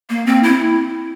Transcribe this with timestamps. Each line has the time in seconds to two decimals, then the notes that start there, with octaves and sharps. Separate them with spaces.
0.10 A#3
0.26 C4
0.43 E4